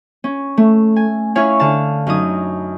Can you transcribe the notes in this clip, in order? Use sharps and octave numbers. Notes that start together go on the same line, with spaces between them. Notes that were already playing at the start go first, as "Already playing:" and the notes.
C#4
A3
G#5
C#4 E4 C#5 F5 G#5 C#6
D3 F5 A5
F#2 C#4 D#4 D#6